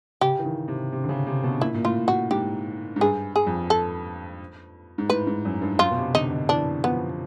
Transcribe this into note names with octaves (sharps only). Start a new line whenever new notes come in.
C#3 G4
E3
D#3
C3
C3
D3
C#3
C3
B2
A#2 E4
A#2
A2 F4
A2 F#4
G#2 G4
G#2
G2 G#4
G#4
F2
A4
G#2
A2 B4
G#2
F#2
G2
F#2 F4
B2
C3
D3 D#4
D3
E3 D4
F3 B3